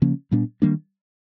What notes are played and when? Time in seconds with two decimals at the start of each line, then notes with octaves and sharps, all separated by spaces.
0.02 C#3 F3 A#3 C#4
0.31 A#2 G3 B3 D4
0.62 D#3 G3 A#3 D4